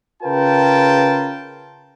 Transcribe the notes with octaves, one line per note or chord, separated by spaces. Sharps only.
C#3 F4 A#4 B4 G5 A5